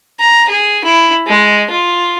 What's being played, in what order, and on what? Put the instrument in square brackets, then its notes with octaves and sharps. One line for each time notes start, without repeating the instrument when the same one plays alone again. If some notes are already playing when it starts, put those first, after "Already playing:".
[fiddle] A#5
G#4
E4
G#3
F4